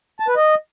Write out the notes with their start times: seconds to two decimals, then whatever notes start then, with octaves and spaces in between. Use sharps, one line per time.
0.20 A5
0.28 B4
0.36 D#5